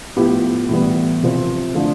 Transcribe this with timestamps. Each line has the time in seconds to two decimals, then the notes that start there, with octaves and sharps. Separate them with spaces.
0.16 A2 F3 B3 E4 G4
0.69 A2 E3 G3 B3
1.23 C3 F3 C4
1.75 D3 F3 A3